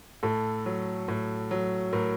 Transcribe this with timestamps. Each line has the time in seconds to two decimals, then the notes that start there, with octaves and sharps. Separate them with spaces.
0.23 A2 A4
0.66 F#3
1.08 A2
1.51 F#3
1.93 A2 A#4